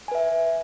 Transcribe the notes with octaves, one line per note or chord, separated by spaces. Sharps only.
B4 E5 G#5